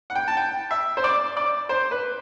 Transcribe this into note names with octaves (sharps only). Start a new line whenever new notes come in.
F#5
G5
A5
G5
E5
C5
D5
D5
C5
B4